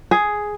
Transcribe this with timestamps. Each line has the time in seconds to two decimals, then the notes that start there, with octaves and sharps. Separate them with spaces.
0.11 G#4